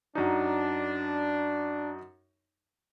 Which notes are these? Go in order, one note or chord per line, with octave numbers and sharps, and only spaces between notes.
F#2 D4 D#4